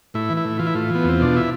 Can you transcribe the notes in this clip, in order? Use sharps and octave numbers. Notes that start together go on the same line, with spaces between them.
A2 E4
E3
E4
A2
E3 F4
E4
A2 F4
E3 B3
E2 C4
B2 D4
E4